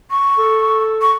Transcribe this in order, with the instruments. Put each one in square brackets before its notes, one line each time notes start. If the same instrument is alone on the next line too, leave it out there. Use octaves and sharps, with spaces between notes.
[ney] C#6
[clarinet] A4
[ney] C#6